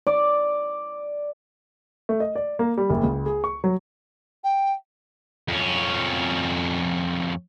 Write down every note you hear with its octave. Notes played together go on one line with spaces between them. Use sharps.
D5
A3
D#5
D5
A#3
G3
F#1
C#2
G#4
C#6
F#3
G5
F2 C#4